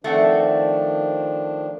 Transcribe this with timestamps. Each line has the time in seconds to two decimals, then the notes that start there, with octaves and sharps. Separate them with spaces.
0.04 D#3 F3 A3 C4 D4 F#5